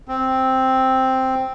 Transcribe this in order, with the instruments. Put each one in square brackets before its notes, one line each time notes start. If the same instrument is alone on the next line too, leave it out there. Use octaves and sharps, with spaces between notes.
[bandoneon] C4